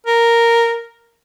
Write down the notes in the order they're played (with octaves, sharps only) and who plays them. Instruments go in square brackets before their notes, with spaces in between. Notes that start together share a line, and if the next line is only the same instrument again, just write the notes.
[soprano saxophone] A#4